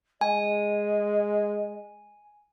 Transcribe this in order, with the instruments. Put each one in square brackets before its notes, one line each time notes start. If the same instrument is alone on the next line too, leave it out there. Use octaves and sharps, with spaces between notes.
[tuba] G#3 [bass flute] D#5 [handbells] G#5